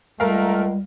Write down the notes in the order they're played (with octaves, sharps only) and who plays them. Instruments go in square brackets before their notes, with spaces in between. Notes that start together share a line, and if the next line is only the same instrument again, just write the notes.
[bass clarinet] C#2 [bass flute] G3 [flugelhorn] A3 [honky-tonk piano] A#4 F5